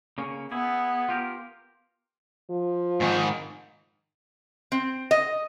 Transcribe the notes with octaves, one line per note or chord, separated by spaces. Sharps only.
C#3 A#3 C#4
B3 E4 G#4
F4 G4 A#4
F3
G#2 D#3
C4
D#5